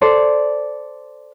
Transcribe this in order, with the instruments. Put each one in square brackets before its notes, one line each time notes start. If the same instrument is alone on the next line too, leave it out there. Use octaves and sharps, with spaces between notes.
[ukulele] A4 C5 D5